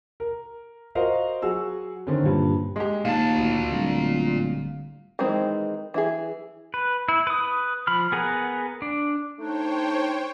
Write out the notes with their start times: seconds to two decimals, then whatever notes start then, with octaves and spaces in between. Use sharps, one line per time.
0.20 A#4
0.95 F#4 A#4 C5 D#5 F5
1.42 F#3 F#4 G#4 E6
2.07 D3 D#3 C4 C#4
2.22 G2 A#2
2.76 G#3 G4 G#5
3.05 D#2 A#2 F5 A5
3.37 D2 F#4
3.71 D1 D3 G3
5.19 D#3 E3 G#3 C4 D#4
5.94 E3 E4 G#4
6.74 B4
7.09 E4
7.27 B4 D#6
7.87 F3 B5 F6
8.12 B3 G#4 A#4 F#5
8.82 D4
9.39 A3 D4 D#4 C5 C#5 G5